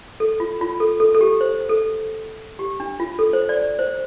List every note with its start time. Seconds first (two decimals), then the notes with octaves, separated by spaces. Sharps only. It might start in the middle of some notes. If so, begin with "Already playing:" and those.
0.20 A4
0.40 F4
0.61 F4
0.80 A4
1.00 A4
1.15 A4
1.21 G4
1.41 C5
1.69 A4
2.59 G4
2.80 D4
3.00 F4
3.19 A4
3.33 C5
3.49 D5
3.79 C5